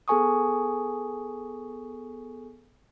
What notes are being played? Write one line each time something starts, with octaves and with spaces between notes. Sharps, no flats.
B3 G#4 A4 G#5 C#6 D#6